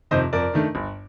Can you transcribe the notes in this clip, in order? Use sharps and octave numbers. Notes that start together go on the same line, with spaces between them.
F2 C3 D#3 C5 D#5
F2 A#4 D5
D#3 A3 D4
G1